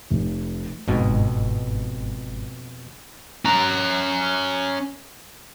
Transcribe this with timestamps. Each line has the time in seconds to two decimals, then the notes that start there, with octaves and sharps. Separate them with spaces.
0.11 F1
0.88 G1 F2 G#2 B2
3.45 C#4 A#5